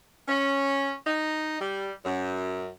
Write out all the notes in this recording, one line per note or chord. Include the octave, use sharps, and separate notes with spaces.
C#4
D#4
G3
F#2